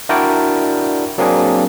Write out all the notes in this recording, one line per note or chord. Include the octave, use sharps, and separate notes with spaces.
D4 E4 F#4 A#4 D5 G5
F#3 A#3 C4 D4 G#4